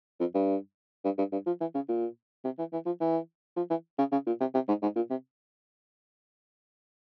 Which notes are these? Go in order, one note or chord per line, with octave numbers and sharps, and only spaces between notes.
F2
G2
G2
G2
G2
F3
E3
C#3
A#2
C3
E3
E3
F3
E3
F3
E3
C#3
C#3
A#2
C3
C3
G#2
G#2
A#2
C3